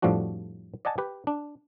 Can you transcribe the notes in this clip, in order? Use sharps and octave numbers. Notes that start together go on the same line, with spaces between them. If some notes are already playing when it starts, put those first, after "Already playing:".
F2 A2 F3 G3 D4 F#4
D5 D#5 F#5 G#5 A5
G4 B4
D4